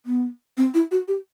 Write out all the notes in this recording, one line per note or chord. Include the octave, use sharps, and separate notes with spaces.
B3
C4
E4
F#4
G4